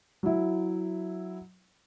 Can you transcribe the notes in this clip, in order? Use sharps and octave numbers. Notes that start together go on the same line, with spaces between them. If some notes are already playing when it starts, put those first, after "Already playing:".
F#3 E4